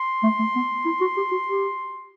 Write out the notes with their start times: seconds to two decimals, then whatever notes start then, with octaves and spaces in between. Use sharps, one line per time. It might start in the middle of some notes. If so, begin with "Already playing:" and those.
Already playing: C6
0.24 A3
0.39 A3
0.55 B3
0.85 E4
1.01 F#4
1.17 G4
1.31 F#4
1.48 G4